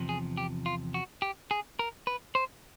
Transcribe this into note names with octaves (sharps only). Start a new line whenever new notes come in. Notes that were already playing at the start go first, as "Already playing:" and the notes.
Already playing: E2 C3 F3
G#4
G4
F4
F#4
G4
G#4
A#4
B4
C5